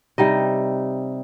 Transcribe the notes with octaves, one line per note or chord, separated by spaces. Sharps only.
C3 G3 D#4 D#5